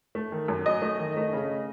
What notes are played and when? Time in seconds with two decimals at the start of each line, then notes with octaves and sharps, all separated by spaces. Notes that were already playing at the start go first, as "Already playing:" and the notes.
0.15 A3
0.32 D#3
0.48 F#2
0.65 F#3 D#5
0.82 A3
0.99 D#3
1.17 A3
1.33 C#3